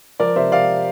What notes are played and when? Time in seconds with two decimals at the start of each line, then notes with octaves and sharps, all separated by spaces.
0.20 F3 A#4 D5
0.36 C3 C5 E5
0.52 C3 D5 F5